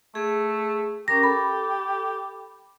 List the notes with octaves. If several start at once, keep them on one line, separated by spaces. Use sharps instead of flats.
A3 G#4
C#4 G4 A#4 A#5 A#6
A4 B5